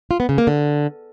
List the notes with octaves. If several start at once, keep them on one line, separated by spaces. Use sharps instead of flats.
F4
B3
C#3
A#3
D3